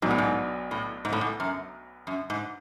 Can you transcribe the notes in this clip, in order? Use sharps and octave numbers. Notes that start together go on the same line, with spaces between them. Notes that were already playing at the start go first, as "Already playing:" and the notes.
B1 G#2 B2 F#3 B3 D4
A2
G#2
A2
G#2
A2
G#2
F#2
F#2
G#2